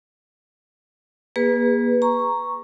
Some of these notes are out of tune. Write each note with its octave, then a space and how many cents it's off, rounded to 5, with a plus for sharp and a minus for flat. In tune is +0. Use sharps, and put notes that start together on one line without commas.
A#3 +35 G#4 -30 B4 +0
A#5 +0 C#6 +0